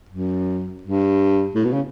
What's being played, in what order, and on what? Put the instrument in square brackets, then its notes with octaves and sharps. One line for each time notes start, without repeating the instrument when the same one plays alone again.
[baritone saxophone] F#2
G2
A2
B2
C#3